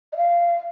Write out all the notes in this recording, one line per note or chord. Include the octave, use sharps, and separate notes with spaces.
D#5
F5